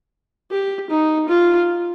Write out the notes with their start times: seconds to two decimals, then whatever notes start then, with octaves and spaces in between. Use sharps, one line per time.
0.51 G4
0.90 D#4
1.29 F4